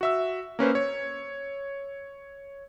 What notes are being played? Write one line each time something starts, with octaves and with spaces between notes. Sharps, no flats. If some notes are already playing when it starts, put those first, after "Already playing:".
F#4 E5 E6
A#3 C#4 B4 C5
C#5